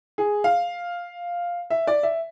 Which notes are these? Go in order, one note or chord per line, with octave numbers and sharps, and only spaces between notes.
G#4
F5
E5
D5
E5